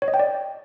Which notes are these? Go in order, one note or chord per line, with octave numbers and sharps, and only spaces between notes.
C#5
D#5
G5
D5